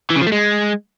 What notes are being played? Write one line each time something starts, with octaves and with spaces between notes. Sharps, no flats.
E3
C#3
F3
A3
G#3